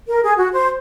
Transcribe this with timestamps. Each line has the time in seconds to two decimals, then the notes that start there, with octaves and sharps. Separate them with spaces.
0.08 A#4
0.22 G#4
0.37 F#4
0.52 C5